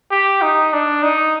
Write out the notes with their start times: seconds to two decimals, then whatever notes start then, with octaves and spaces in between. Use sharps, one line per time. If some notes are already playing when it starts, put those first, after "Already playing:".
0.11 G4
0.42 D#4
0.73 D4
1.03 D#4